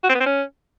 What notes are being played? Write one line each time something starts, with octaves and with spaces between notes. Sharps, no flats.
F#4
C4
B3
C4
C#4